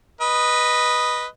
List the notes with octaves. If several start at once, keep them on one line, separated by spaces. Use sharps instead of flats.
B4 D#5